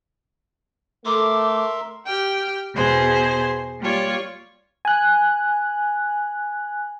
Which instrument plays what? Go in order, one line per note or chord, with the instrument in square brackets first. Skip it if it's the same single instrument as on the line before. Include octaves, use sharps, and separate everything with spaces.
[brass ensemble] A3 [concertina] A#4 E5 C6 [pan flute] D6
[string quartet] G4 G5 F6
E2 B2 G#4 C5 C6
G3 A#3 F4 C#5 D5
[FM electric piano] G#5 F#6